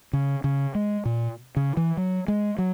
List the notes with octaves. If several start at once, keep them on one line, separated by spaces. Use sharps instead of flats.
C#3
C#3
G#3
A#2
C#3
E3
F#3
G#3
F#3